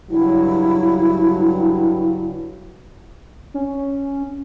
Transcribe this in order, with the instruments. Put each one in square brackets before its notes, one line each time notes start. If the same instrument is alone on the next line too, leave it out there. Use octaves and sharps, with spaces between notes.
[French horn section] G2 C#3 F#3 [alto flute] E4
[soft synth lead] C#4